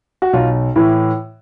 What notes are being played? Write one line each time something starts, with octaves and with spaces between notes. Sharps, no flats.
F#4
B1 F4
A2 E3 E4